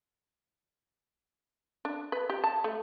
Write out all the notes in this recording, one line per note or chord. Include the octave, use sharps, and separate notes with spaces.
D4
B4
G4
A5
A3